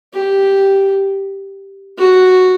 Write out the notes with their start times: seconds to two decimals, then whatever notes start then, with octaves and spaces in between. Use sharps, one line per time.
0.14 G4
1.98 F#4